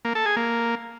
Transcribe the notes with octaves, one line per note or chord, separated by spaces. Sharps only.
A#3
A4
G#4
A#3